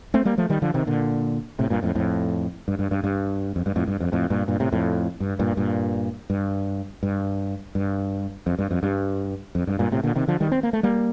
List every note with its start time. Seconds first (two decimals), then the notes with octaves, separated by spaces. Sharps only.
0.14 A3 C4
0.25 G3 A#3
0.38 F3 A3
0.50 D#3 G3
0.62 D3 F3
0.74 C3 D#3
0.87 A#2 D3
1.59 A2 C3
1.70 G2 A#2
1.83 F2 A2
1.95 F2 A2
2.68 G2
2.79 G2
2.91 G2
3.04 G2
3.56 F2
3.66 G2
3.76 F2 A2
3.88 G2
4.00 F2
4.12 F2 A2
4.30 G2 A#2
4.48 G2 A#2
4.60 A2 C3
4.72 F2 A2
5.20 G2
5.39 G2 A#2
5.57 G2 A#2
6.30 G2
7.03 G2
7.75 G2
8.47 F2
8.59 G2
8.71 F2
8.83 G2
9.55 F2
9.67 G2
9.79 G2 A#2
9.92 A2 C3
10.03 A#2 D3
10.16 C3 D#3
10.28 D3 F3
10.40 D#3 G3
10.52 C4
10.63 A#3
10.73 A3
10.83 G3 A#3